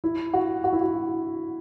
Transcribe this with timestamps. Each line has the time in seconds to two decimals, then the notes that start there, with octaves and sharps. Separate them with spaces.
0.04 E4
0.33 F#4
0.64 F#4
0.73 E4
0.81 F#4